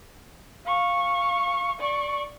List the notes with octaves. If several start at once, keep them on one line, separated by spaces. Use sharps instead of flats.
F5 C#6
D5 C#6